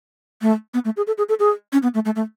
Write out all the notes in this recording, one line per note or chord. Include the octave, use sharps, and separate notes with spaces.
A3
B3
A3
G#4
A4
G#4
A4
G#4
C#4
B3
A3
A3
A3